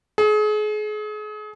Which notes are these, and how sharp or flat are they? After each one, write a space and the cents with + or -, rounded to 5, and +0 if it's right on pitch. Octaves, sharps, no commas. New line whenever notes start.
G#4 +35